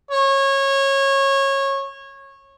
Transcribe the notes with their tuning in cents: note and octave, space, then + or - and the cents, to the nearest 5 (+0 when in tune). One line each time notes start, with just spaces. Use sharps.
C#5 -20